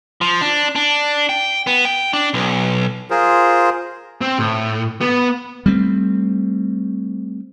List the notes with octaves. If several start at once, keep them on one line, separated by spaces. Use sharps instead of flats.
F3
D4
D4
G5
B3
G5
D4
B1
F4 G#4 A#4 C5
C4
A2
B3
G3 A3 C4